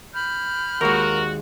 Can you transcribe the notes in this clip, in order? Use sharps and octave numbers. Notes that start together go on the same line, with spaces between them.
B5 F6 G6
D#2 G#3 F#4 A#4